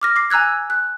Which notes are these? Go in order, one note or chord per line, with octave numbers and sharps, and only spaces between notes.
D6 F6 A#6
D6 C7
G#5 A#5 E6 F#6 G#6
F#6